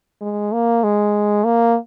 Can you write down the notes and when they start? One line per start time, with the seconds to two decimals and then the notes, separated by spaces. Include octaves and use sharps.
0.21 G#3
0.53 A#3
0.84 G#3
1.44 A#3